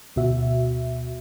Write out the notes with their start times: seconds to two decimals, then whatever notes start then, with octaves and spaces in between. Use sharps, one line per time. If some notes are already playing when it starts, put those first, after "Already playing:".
0.16 D2 B2 F#4 E5